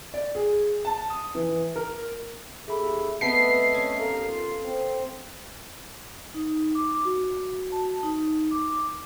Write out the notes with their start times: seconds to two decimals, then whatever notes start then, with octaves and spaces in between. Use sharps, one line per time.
0.14 D5
0.35 G#4
0.85 A5
1.10 D#6
1.35 E3
1.76 A#4
2.68 D#2 G#4 A4 E5 B5
3.21 A3 B3 C4 D#5 E5 A5 B6 C7
3.74 C#4
3.99 D#2 A4 A#4 F5 A#5
4.27 F4
4.62 C4
6.34 D#4
6.75 D6
7.05 F#4
7.72 A5
8.03 D#4
8.51 D6